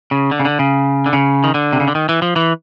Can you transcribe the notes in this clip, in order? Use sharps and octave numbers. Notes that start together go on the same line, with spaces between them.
C#3
D3
C#3
D3
C#3
D3
C#3
D#3
D3
C3
C#3
D3
D#3
E3
F3
E3